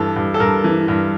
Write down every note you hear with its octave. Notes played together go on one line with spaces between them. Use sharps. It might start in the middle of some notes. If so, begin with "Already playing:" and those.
Already playing: G2 E3 A4
G2
A4
G2 A#4
E3
G2